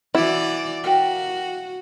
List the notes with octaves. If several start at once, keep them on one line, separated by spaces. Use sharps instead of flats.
E3 E4 F#4 D5
F#4 G4 A#4 F5